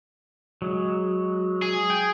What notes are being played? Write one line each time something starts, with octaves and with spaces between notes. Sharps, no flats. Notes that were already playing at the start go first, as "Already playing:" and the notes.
F#3 G#3
G#4
G5